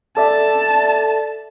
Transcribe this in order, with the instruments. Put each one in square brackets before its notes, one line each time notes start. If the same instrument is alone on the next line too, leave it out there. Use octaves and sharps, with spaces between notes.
[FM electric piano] A4 D5 E5 [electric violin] A5